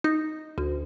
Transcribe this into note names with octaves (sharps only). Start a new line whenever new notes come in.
D#4
D2